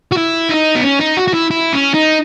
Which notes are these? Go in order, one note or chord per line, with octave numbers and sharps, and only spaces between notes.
F#4
E4
D#4
B3
C#4
D#4
F#4
F#4
E4
E4
C#4
D#4